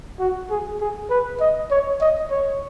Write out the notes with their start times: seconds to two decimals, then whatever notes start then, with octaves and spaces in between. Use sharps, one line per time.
0.20 F#4
0.50 G#4
0.81 G#4
1.10 B4
1.41 D#5
1.71 C#5
2.01 D#5
2.30 C#5